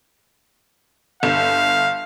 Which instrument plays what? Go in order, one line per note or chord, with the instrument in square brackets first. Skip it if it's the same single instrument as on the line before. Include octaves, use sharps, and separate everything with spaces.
[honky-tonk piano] G1 [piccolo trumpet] F5